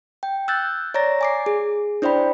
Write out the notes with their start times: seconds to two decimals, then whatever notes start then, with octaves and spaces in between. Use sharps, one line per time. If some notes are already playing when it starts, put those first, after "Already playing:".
0.23 G5
0.48 E6 F#6 G6 A6
0.94 C#5 D5 A#5 A6 A#6
1.21 G#5 D6 C7
1.46 G#4
2.02 D4 E4 C5 D5 G5 B5